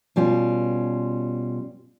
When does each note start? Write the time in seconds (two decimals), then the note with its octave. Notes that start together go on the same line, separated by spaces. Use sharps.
0.16 B2 G3 C#4 F4